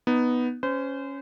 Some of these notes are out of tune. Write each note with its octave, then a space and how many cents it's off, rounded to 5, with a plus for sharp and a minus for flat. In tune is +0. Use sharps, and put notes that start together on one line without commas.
B3 +0 D#4 +0
C#4 +0 C5 -30